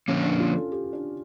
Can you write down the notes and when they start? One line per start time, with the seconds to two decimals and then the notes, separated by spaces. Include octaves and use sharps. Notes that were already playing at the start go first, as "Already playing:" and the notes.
0.08 D3 F3 A#3 C#4
0.24 D4
0.40 F4
0.56 A4
0.72 G4
0.93 D4